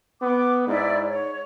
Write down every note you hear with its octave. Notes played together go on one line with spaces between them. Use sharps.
B3 D6
G#2 E4 D5
C#5